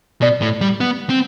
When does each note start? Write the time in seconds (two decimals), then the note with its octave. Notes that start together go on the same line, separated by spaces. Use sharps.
0.22 B2 D5
0.42 A2
0.61 G3
0.80 B3
1.09 C4